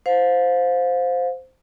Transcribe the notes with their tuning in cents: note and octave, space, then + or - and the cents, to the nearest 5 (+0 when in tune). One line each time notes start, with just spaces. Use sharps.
C5 -5 F5 +30